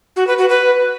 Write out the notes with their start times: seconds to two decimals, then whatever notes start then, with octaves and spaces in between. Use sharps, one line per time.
0.16 F#4
0.27 B4
0.38 F#4
0.49 B4